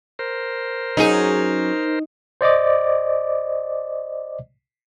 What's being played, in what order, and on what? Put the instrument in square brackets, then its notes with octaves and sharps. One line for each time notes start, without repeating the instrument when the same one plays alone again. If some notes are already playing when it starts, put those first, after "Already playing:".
[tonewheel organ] A#4 C5
[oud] F#3 C#4 G#4 [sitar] D#4
[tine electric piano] C5 D5 D#5 D6